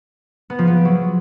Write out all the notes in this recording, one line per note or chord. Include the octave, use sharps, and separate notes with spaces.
B3
F3
B3
C4
F#3